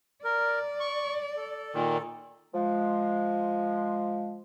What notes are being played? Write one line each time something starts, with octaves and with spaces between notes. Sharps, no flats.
A#4 D5
C#6
A4
A#2 D#3
F3 G#3